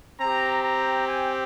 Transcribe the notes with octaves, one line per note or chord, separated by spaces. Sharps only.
C4 G4 A#5
A#5
G#5